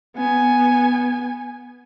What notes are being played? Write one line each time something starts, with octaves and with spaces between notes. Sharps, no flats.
B3 G#5